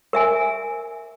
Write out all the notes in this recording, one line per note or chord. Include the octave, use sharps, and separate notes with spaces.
A#4 E5 G#5